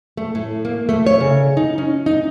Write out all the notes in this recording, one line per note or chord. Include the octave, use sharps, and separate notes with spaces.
A3
A2
A#3
A3
C#5
C#3
D#4
C#4
D#4